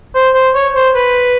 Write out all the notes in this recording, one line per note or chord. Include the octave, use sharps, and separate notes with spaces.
C5
C5
C#5
C5
B4